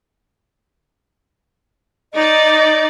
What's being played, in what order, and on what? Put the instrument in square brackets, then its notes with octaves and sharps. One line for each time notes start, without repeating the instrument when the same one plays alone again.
[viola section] D#4 D5 [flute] D#5